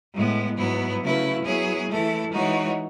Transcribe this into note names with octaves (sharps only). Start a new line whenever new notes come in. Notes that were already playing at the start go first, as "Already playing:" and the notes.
A2 G#3 B3
G#2 F#3 B3 E4
C#3 F#3 A3 E4 B4
F#3 B3 E4 G#4 C#5
E3 A3 E4 A4
E3 G#3 D#4 F#4 C#5